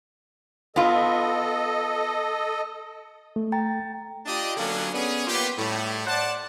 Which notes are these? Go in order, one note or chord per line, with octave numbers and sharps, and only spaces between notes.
B3 F4 A4 D#5
A3
G5 A#5 A6
D4 F4 G4 D5 D#5
D3 F#3 A#3 B3 C#4 D4
B3 C#4 D4 G#4
A#3 B3 F4 G4
A2 G3
C5 D5 F#5 A5